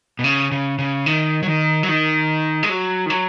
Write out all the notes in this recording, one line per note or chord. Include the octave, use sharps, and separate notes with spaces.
B2
C#3
C#3
C#3
D#3
F#3
D#3
F#3
D#3
G#3
F#3
D#3
F#3